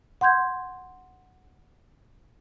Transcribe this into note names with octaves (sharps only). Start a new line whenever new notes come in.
F#5 C6 G6 G#6